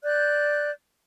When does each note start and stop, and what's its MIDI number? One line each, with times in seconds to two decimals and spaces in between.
0.03 0.69 74
0.03 0.69 90
0.03 0.69 91